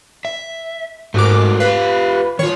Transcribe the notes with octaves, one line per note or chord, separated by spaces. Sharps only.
E5
G#2 A3 F#4 A#4 D6
F4 G4 B4 F5
D#3 F4 C#5